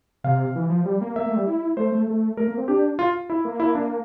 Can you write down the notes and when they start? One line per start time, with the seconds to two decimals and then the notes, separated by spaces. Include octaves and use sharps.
0.24 C3 F5
0.55 E3
0.70 F3
0.85 G3
1.01 A#3
1.16 A#3 E5
1.26 A#3
1.31 A3
1.36 G3
1.47 E4
1.77 A3 C5
1.92 A3
2.07 A3
2.37 A3 A#4
2.48 A#3
2.58 C4
2.68 D4 G4
2.99 F4
3.30 E4
3.45 A#3
3.60 E4
3.75 D4